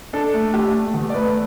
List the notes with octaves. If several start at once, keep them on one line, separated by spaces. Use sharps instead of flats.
D4 A4
A3
A3 G4
A3
E2
D5
A3 B4